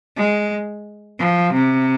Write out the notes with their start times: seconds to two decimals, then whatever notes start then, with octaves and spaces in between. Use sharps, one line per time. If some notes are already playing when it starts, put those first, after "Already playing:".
0.16 G#3
1.19 F3
1.53 C3